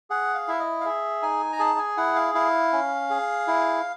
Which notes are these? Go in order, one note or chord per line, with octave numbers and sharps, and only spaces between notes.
G#4 F#5
F5
E4 E5
D#5
F5
G#4 E5
D#4 G#5
A#5
G#4 A5
G#5
E4 F#5
F5
E4 F5
C#4
G#4
E4